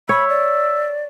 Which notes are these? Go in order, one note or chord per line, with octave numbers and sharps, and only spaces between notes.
C#5 E5 B5
D5